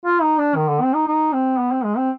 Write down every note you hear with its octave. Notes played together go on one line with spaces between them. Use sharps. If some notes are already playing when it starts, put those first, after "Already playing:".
F4
D#4
D4
D#3
D3
C4
D#4
D#4
C4
B3
C4
G#3
C4